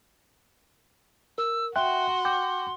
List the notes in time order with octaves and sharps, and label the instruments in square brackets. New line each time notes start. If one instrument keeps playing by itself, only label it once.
[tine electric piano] A#4 [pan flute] E6
[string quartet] F#4 [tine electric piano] E5 G5 F#6 [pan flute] C6
[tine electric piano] G5 D6 G6